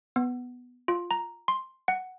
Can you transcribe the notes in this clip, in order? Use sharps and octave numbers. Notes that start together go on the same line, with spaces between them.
B3
F4
A#5
C6
F#5